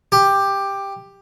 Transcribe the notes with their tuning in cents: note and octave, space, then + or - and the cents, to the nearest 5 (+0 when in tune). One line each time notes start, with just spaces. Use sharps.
G4 +10